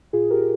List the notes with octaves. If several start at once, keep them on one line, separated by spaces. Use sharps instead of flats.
A#2 F4 G#4
G4 A#4